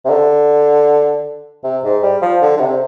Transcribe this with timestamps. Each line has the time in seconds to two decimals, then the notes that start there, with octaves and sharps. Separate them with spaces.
0.05 C3
0.10 D3
1.64 C3
1.84 G#2
2.03 G3
2.22 F3
2.41 D3
2.57 D3
2.61 C3